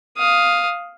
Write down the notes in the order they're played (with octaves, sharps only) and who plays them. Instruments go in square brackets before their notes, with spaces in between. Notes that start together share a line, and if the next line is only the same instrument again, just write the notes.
[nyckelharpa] F5 D#6